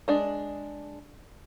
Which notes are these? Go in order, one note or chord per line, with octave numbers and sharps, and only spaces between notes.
G#3 D4